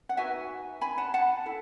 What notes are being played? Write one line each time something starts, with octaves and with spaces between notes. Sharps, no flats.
F#5
D#4 F#4 B4 E5 G#5
G#5 B5
F#5 A5
F#5 A5
E4 A4